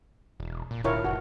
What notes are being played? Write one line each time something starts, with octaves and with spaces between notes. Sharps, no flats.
E1
A#2
D1 A2 D3 E4 F4 A#4 C#5
F1 F#4